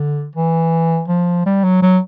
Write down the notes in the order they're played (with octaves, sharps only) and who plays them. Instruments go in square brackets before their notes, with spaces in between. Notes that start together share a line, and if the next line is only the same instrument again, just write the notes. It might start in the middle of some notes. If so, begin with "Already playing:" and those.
Already playing: [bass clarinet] D3
E3
F3
G3
F#3
F#3